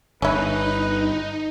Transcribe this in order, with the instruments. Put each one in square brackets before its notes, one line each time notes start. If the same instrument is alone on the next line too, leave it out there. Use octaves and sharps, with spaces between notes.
[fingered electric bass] G1 [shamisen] C#4 E4 [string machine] D#4 [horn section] B4